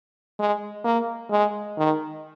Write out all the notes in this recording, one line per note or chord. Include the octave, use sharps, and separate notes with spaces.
G#3
A#3
G#3
D#3